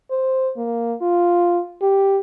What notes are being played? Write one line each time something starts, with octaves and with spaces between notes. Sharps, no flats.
C5
A#3
F4
G4